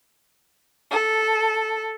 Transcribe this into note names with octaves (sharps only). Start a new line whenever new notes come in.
A4